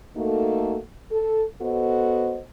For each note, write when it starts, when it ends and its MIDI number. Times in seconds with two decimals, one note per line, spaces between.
0.17 0.78 57
0.17 0.78 58
0.17 0.78 63
0.17 0.78 66
0.17 0.78 69
1.12 1.45 69
1.62 2.41 59
1.62 2.41 66
1.62 2.41 69
1.62 2.41 72
1.62 2.41 75